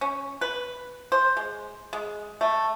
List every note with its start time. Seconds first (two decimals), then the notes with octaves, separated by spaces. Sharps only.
0.01 C#4
0.41 B4
1.12 C5
1.37 G#3
1.93 G#3
2.41 A3